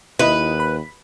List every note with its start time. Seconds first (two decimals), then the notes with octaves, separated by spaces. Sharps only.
0.19 D#2 E4 B4 D#5
0.60 B5